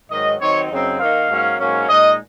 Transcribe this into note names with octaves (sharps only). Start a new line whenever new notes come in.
G#2 D#3 F#3 D#5
D#3 F#3 C4 D#4 C#5
F#2 C#3 F#3 C4 D#4
D#3 A#3 D#4 F5
G#2 F#3 A#3 C#4
G#2 F#3 A#3 C#4
A#2 G#3 D#4 D#5